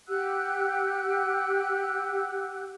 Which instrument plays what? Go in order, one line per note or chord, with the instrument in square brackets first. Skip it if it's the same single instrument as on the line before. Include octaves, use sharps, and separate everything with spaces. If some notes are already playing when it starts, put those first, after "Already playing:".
[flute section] G4 F#5 E6 F#6